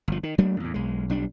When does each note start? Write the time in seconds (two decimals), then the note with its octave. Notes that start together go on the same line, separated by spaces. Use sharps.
0.08 G1 F3
0.23 D#3
0.38 F#3 A3 A#3 D4
0.60 E2 A2
0.74 B1 G#3
1.10 B1 G3 D4